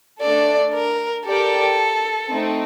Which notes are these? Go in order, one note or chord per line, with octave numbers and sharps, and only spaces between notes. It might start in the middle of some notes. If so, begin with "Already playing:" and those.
A3 D4 A4 D5
A#4
G4 A4 A#4 D5 G5
A3 C4 D#4